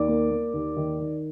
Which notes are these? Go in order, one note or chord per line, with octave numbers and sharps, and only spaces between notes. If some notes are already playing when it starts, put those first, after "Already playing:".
Already playing: D#2 D5 D6
A#3
A#3
D#2
D#3
D#3